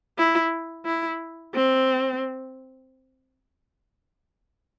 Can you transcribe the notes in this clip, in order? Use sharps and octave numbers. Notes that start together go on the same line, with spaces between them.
E4
E4
C4